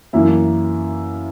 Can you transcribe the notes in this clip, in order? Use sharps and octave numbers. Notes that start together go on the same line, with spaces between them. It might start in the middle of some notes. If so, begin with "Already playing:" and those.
F#2 E3 A#3 E4